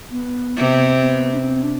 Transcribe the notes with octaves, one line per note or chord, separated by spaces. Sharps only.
B3
C3
B3
D4
C4
D4